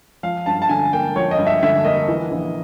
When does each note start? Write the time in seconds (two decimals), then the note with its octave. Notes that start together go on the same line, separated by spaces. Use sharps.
0.23 F3 F5
0.46 G2 A5
0.62 A5
0.69 D3 G#5
0.93 A#3 G5
1.16 F3 C#5
1.31 D#5
1.38 G2
1.47 E5
1.63 D3 E5
1.85 A#3 D#5
2.08 E3
2.31 A#1